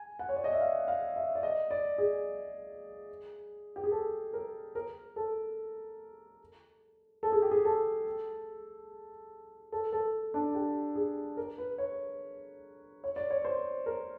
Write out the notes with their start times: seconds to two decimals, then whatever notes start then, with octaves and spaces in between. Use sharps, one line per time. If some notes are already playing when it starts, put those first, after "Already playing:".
Already playing: G#5
0.19 F#5
0.29 C#5
0.36 D5
0.44 D#5
0.53 E5
0.61 F5
0.88 F5
1.16 E5
1.35 D5
1.43 D#5
1.71 D5
1.98 G#4
3.76 G4
3.84 G#4
3.92 A4
4.33 A#4
4.75 A#4
5.16 A4
7.23 A4
7.32 G#4
7.42 G4
7.51 G#4
7.65 A4
9.72 A4
9.93 A4
10.34 D4
10.55 G4
10.95 G#4
11.37 A#4
11.58 B4
11.78 C#5
13.04 C#5
13.16 D5
13.30 C#5
13.45 C5
13.86 A#4